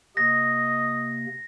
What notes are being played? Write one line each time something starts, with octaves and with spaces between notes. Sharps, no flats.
C3 A#3 D#5 A#6